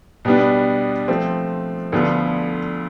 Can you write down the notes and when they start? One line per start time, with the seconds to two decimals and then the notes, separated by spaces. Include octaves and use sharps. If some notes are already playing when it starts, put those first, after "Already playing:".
0.25 B2 G3 B3 D4
1.08 F3 A3 C4
1.92 D2 D3 F3 B3 F4